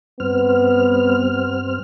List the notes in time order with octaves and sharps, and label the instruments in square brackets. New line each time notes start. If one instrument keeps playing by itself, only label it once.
[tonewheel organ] G2 C4 F6 [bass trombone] B3